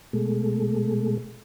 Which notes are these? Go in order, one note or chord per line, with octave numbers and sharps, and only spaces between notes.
B2 G#3 A3